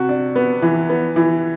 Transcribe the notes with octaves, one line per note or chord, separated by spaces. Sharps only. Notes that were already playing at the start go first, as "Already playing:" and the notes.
Already playing: C3 F#4
D4
B3
E3
B3
E3